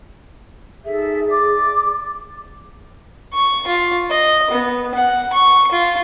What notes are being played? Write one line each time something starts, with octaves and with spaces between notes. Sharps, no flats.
D#4 G#4 A4 E5
D5 D6
C#6
F4
D#5
B3
F#5
C#6
F4